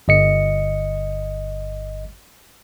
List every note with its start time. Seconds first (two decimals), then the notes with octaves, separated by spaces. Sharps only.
0.08 G1 D#5 C#7